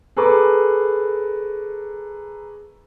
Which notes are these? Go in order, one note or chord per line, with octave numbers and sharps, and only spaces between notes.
G#4 A4 B4 A#5 C#6 D6